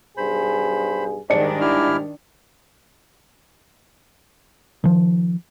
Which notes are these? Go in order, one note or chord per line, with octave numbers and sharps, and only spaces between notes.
B1 G2 G#4 C5 B5
G#2 D#3 G3 D4 D5 A5 C#7
E4 G4 F6
D#3 F3